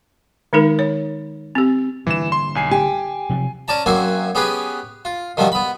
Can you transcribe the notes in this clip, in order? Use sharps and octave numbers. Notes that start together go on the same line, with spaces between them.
D#3 G#3 D#4 A#4
C#5
C4 G4
D3 E3 G3 A#3 E7
C6
B1 G#5 C7
G4 G#5
C3 F3 F#3
C#4 D5 A5 A#5
F#2 A#3 C4 F#4 G#5
B3 C#4 G4 G#4 B4
F4
D#3 F3 G3 C4 F#4
B3 B5